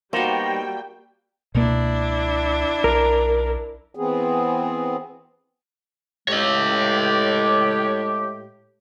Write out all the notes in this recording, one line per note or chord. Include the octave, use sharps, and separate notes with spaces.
G3 A#3 B3 D#4 F#4 C5 G5
C#2 B2 A#3 D4 E4
B1 A#4
E3 B3 C4 G#4
A2 G#3 G4 C#5 D#5